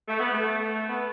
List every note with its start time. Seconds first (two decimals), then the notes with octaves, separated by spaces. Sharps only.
0.08 A3
0.20 B3
0.32 A3
0.89 B3